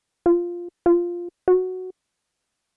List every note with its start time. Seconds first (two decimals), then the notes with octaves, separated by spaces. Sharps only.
0.26 F4
0.86 F4
1.48 F#4